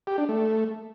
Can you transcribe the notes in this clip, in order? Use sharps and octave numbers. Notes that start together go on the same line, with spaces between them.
G4
D4
A3